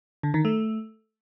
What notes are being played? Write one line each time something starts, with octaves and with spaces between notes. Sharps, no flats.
D3
D#3
A3